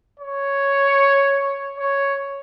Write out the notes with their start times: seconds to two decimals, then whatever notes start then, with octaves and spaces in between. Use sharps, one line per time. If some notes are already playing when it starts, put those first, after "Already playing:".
0.19 C#5
1.78 C#5